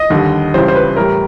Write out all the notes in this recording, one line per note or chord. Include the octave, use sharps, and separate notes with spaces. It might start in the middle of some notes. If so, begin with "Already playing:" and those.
Already playing: D#5
D#2 D3 G3
C#2 C#3 E3 G3 C5
C5
B4
A2 E3 G3 A#4